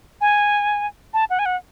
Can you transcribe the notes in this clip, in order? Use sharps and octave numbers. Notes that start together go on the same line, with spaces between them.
G#5
A5
F#5
G#5
F#5